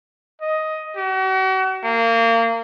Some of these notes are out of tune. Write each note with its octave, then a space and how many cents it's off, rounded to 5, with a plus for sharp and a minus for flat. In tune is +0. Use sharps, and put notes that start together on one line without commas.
D#5 +10
F#4 +40
A#3 -30